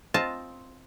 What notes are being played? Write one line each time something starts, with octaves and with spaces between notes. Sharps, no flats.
C4 F4 D#5 A5